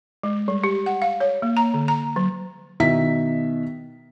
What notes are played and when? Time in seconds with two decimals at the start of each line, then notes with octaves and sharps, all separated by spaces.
0.23 G#3
0.48 G3
0.64 G4
0.86 F#5
1.02 F5
1.20 C#5
1.42 A#3
1.57 A#5
1.74 D3
1.88 A#5
2.16 F#3
2.80 B2 D#3 E5 B6